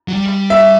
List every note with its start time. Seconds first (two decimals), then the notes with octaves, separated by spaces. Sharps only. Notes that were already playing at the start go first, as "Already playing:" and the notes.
0.08 F#3
0.13 G3
0.50 E5